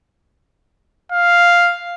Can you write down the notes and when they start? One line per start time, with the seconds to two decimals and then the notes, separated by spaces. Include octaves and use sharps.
1.12 F5